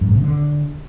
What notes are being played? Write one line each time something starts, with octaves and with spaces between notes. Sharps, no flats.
F#2
G#2
C3
D3